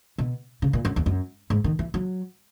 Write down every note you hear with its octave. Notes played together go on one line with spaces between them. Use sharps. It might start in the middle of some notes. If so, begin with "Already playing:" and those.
B2
C#3
A#2
F#2
E2
F#2
G#2
D#3
E3
F#3